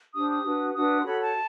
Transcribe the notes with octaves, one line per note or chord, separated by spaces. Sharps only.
D4 G4 C5 D#6
D#6
D4 F#4 B4
D4 F#4 B4 D#6
C6
F#4 A4 C#5 B5
A5